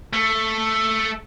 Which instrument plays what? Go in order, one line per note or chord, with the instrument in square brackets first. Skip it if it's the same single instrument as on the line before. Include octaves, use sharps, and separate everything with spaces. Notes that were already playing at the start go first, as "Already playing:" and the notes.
[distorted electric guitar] A3